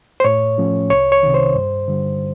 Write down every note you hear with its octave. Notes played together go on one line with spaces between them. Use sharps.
C5
A2 C#5
F3 A3 C#4
C2 C#5
C#5
C3 D#3
C5
G2
D3 G3